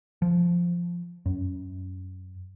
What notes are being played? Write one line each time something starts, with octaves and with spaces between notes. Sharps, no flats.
F3
F#2